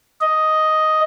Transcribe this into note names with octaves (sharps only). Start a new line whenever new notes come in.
D#5